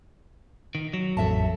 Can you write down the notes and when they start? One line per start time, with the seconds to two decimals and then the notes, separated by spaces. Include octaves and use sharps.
0.75 D#3
0.93 F#3
1.17 A1 F2 A4 E5 A5